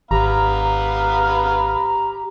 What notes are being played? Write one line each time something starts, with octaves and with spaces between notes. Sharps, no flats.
G#1 B3 G4 F5 A#5 B5